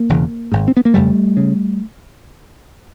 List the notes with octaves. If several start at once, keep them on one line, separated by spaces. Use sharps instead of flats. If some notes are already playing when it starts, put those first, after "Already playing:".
Already playing: A#3
E1 E2 C#3
G#1 G#2
C4
B3
A#3
F#1 F2 C#3 G3 A3
C#3